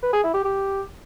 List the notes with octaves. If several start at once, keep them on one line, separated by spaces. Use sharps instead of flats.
B4
G#4
E4
G4
G4